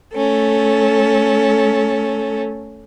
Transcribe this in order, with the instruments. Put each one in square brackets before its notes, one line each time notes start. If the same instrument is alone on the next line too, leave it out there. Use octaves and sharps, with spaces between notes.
[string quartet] A3 C#4 A4